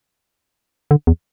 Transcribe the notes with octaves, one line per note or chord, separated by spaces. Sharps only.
D3
E2